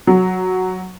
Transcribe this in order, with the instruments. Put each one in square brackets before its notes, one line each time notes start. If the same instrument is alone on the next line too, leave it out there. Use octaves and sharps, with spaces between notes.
[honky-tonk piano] F#3